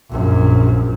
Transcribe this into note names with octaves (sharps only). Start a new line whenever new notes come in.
A#1 F#2